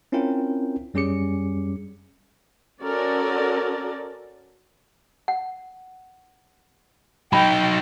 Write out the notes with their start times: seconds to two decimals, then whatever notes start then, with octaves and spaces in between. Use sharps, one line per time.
0.12 C4 C#4 E4 F4 A#4 G5
0.94 F#2 G3 C#4 G#4 D6 C#7
2.83 C#4 F#4 A4 A#4 D5
5.28 F#5
7.33 F#3 D#4 G5 B5